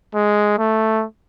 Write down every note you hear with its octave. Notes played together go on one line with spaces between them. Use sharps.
G#3
A3